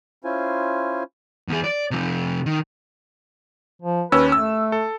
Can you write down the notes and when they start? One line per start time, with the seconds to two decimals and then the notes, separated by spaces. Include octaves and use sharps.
0.24 C#4 E4 F4 C5 G#5
1.48 E2 G#4
1.64 D5
1.91 C3 F3
2.46 D#3
3.82 F3
4.12 D#2 C#4 B4 E6
4.32 A3 E6
4.72 A4